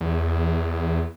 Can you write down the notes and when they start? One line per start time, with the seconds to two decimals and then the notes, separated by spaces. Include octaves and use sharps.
0.01 E2